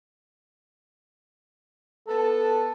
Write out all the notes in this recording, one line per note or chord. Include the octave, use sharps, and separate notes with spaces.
B3 A4 B4 A5